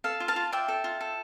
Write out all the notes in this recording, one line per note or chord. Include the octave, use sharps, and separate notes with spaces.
A4 F5
F4
F5 A5
F4
D5 E5 G5
A4
F4
A4